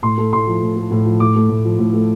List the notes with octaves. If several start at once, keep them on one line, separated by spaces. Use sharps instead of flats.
A2 C6
A3
A2 C6
F3
A2
A3
A2
F3
A2 D6
A3
A2
F3
A2
A3